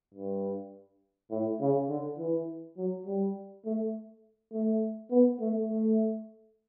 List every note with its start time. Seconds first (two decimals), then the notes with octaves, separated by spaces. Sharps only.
0.14 G2
1.31 A2
1.61 C#3
1.89 D3
2.18 E3
2.77 F#3
3.06 G3
3.65 A3
4.53 A3
5.10 B3
5.40 A3
5.69 A3